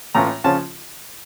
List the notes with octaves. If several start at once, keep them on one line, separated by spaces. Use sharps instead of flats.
A2 E3 A3 C#4 F4 A#5
C#3 F3 C#4 F4 A5